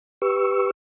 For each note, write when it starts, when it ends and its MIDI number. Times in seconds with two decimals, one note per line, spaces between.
0.22 0.71 67
0.22 0.71 71
0.22 0.71 85
0.22 0.71 88